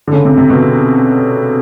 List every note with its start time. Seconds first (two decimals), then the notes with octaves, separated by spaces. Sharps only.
0.07 D3
0.13 C#3
0.25 C3
0.38 C3
0.50 B2